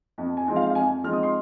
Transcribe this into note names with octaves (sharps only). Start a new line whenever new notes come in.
F2
G#5
F3 G#3 C4 D#4
F5
F5
F2 G#5
F3 G#3 C4 D#4 F6
D#6
C6